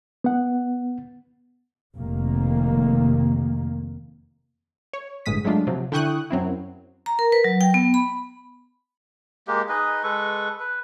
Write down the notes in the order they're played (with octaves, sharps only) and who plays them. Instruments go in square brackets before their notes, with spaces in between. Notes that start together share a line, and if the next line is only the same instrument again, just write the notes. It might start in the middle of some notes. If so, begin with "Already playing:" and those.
[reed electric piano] B3 F#5
[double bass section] F1 C3 D#3 A#3
[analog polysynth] C#5
G1 A2 G#3 D#6 B6
F#3 G#3 A3 D4 F4
C3 F3 F#3
D3 E4 G5 C#6 D#6 F#6
F#2 F#3 C4 E4
[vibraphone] A#5
A#4
B4
F#3
G5
B3
B5
[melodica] G#3 A#3 G4
D#4 G#4 B4 D#5
G#3 A4 B4 C#6
B4